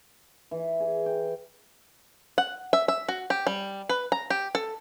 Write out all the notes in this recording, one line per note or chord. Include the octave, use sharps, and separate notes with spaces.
E3
G#4
G5
F#5
E5
E5
F#4
G4
G3
B4
A#5
G4
A4